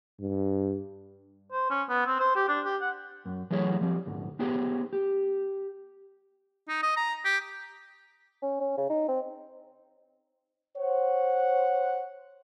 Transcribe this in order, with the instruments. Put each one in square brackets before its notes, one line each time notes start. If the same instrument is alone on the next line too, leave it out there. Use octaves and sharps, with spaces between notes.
[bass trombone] G2
[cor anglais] C5
C#4
B3
C4
C5
G4
D4
G4
F#5
[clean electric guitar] F#2
E3 F#3 A3 E4 G#4 C#5
F3 G3 C4
D2 G#2
B3 D#4 G4 G#4 C5
G4
[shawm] D#4
D#5
A#5
G4
[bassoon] C#4
C#4
C#3
D#4
C4
[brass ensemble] C5 C#5 F#5